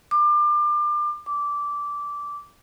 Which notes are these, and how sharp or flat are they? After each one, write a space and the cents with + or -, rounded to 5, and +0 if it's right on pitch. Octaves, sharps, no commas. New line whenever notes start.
D6 +30
D6 -15